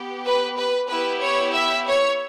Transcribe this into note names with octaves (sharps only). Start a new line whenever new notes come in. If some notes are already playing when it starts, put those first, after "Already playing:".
Already playing: B3 G4
B4
B4
B3 E4 G4 B4
C#5
E5
C#5